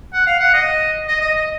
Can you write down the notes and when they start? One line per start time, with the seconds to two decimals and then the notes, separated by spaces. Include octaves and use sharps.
0.13 F#5
0.27 F5
0.40 F#5
0.54 D#5
1.07 D#5
1.21 D#5
1.35 D#5